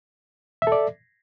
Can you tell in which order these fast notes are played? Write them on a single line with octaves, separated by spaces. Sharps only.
E5 A4 D5